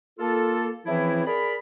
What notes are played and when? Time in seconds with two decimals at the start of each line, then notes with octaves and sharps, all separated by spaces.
0.19 A#3 F4 A4
0.86 C#3 E3 F3 C4 E4
1.27 G#4 A#4 D5 B5